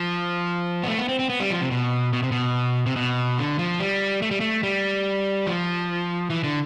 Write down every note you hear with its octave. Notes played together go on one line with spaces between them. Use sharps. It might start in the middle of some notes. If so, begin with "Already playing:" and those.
Already playing: F3
B3
A3
B3
C4
C4
B3
G3
F3
C3
B2
B2
C3
B2
C3
B2
D3
F3
G3
A3
G3
A3
G3
F3
E3
D3